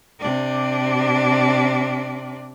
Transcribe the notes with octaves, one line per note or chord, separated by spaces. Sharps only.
C3 D4